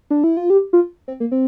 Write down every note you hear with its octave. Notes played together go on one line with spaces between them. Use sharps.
D4
E4
F4
G4
F4
C4
A#3
C4